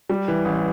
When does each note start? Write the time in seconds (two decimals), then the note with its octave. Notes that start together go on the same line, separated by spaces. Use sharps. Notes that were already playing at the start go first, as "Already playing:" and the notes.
0.10 G3
0.28 E3
0.45 A1